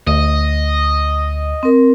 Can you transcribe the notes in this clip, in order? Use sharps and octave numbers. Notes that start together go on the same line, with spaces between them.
D2 D#5
C4 A#4